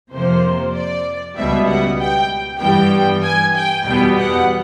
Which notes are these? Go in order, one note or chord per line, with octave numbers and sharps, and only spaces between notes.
F2 C3 F3 A#3 C5
D5
C#2 B2 G3 B3 E5
F#5
G5
G2 E3 G3 B3 G5
G#5
G5
E2 B2 G3 B3 G5
F#5